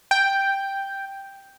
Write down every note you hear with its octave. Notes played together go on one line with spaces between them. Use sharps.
G5